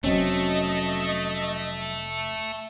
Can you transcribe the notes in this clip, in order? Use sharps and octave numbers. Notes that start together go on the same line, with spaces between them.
F1 F#3 A3 C4 C#4 D#5